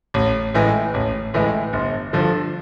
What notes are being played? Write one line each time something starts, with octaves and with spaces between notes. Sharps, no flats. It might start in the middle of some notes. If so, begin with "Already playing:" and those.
A1
A2 E3 G#3
A1
A2 E3 G#3
G1
G2 D3 F3